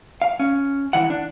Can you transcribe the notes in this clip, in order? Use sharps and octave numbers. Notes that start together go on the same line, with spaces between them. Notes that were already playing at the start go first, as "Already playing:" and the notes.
F5
C#4
C2 E3 F#5
D4